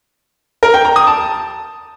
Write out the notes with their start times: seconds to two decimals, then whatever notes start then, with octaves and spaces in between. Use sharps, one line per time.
0.63 A#4
0.74 G5
0.85 A#5
0.96 D#6
1.07 A5